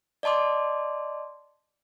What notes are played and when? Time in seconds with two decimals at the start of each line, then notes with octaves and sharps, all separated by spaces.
0.23 D5 D#5 A5 C6 D6